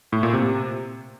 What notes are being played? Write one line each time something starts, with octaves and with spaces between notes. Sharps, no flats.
A2
A#2
C3